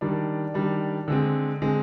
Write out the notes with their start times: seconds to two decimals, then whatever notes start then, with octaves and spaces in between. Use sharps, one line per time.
0.01 D#3 G3 D4
0.54 D#3 G3 D4
1.08 D3 G#3 C4
1.62 D3 G#3 C4